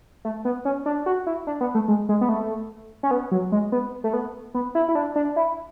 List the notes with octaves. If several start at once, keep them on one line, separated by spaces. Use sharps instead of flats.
A3
B3
C#4
D4
F#4
E4
D4
B3
A3
G#3
G#3
B3
A3
C#4
B3
F#3
G#3
B3
A3
B3
B3
E4
E4
D4
D4
E4